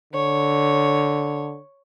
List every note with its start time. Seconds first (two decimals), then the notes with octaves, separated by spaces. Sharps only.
0.13 D3 C#5